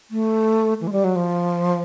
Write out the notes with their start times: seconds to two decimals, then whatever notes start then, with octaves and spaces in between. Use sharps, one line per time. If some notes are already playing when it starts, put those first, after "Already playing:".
0.11 A3
0.81 E3
0.87 G#3
0.93 G3
1.04 F#3
1.16 F3